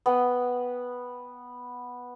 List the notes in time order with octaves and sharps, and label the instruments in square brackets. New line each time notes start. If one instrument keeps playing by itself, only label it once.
[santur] B3 F#5 G5